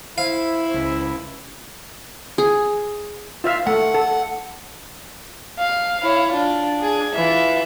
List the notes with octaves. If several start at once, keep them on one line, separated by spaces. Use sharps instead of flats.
E4 C5 F5
C#2
G#4
F4 E5 F5
A3 F#5
A4
F5
E4 C#5
D4 F4
G#4 G#5
E3 F4 E5